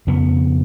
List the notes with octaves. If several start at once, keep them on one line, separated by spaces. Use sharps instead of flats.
F2 C#3 B3